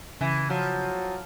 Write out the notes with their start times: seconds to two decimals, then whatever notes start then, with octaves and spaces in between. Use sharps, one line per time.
0.21 C#3 E3
0.50 F3 F#3